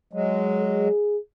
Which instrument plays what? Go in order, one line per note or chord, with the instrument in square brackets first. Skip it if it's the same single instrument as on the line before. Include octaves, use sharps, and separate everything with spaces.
[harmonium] F#3 G#3
[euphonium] G#4